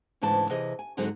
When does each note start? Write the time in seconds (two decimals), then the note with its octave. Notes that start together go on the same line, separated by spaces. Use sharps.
0.21 D2 G#2 C#3 E3 D4 A5
0.50 C3 E3 G#4 D#5
0.79 G#5
0.97 G#2 D3 F#3 C4 D#4 G#4